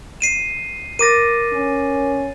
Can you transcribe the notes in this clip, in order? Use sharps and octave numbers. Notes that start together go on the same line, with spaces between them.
C7 D#7 E7
A#4 D6 A6 A#6 D#7
C#4